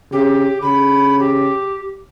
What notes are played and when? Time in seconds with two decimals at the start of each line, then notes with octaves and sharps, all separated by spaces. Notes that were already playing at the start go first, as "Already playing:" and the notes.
0.12 C#3 G4
0.62 C#3 B5
1.19 G4